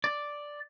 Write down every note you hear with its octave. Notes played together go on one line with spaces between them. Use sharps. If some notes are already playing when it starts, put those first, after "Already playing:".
D5